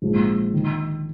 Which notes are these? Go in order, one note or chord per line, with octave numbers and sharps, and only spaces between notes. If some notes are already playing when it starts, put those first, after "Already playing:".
A#1 G#2 F3 G#3
D#3